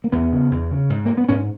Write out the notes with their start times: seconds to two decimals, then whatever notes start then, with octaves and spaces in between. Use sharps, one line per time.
0.04 A#3
0.12 E2 B3
0.32 C#3
0.51 E2
0.71 C#3
0.90 G#2
1.05 A#3
1.17 B3
1.29 G#2 C#4